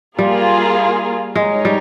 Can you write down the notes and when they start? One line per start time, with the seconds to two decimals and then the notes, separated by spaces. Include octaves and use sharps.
0.18 G3 A#3 F4 G#4
1.35 G#3 D#4 A#4 C#5
1.65 G3